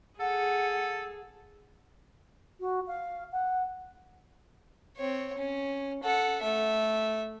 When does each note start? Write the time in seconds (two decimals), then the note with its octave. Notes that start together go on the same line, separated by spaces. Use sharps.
0.20 G#4 A4 F#5
2.60 F#4
2.87 F5
3.32 F#5
4.97 C4 C#5
5.38 C#4
6.03 A4 F#5
6.42 A3 E5